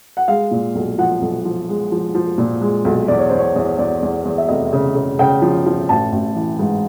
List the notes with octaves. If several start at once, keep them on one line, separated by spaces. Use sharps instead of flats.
F#5
G#3 F5
A#2
B1
F3 F#5
B1
F3
G#3
F3
F3
A#2
G#3
B1
E2 D5
C#5
E2 C5
C#5
E2
E2 D5
E2
E2
E5
F1 D#5
C#3
C#3
C#3 G5
F3
F3
A1 A5
A1
E3
G#2